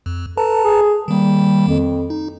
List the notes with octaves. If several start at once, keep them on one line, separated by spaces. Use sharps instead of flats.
F2
A4 B4 A5 A#5
G#4
D#3 G3 A#3
F2
D#4